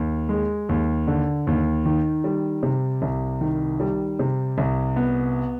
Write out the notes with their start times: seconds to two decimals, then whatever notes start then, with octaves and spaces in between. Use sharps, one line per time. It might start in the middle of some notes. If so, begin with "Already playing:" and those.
Already playing: D#2
0.29 G#3
0.69 D#2
1.07 D3
1.47 D#2
1.86 D#3
2.24 G3
2.63 C3
3.02 C2
3.41 D#3
3.80 G3
4.19 C3
4.58 C2
4.96 B3